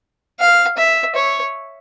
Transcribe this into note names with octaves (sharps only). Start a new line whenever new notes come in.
F5
E5
C#5